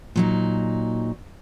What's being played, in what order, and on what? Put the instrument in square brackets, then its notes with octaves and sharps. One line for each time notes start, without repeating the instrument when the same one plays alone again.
[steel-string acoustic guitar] A#2 F#3 D#4